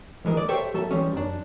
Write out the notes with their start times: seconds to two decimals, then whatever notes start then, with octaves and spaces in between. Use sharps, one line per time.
0.25 D2 E3 G#3 A#4
0.37 D5
0.49 G4 A4 C5 C#5 E5 G5
0.74 F#3 A4 E5
0.91 E3 G3 G#3 C#4
1.13 F#2 D4